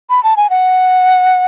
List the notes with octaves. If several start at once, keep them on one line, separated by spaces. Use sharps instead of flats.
B5
A5
G#5
F#5